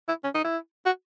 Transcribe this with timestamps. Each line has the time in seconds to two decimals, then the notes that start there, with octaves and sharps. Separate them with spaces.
0.08 E4
0.24 C#4
0.34 D#4
0.45 E4
0.86 F#4